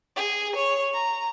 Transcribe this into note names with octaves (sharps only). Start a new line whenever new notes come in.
G#4
C#5
A#5